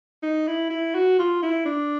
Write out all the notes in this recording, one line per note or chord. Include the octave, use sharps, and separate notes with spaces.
D#4
E4
E4
F#4
F4
E4
D4